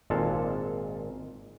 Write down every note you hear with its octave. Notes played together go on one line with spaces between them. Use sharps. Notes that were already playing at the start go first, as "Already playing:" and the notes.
G#1 A#2 G#3 A4 F5 A5